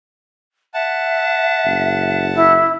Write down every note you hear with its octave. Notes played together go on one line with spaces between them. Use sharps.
E5 F#5 A5
F#1
E4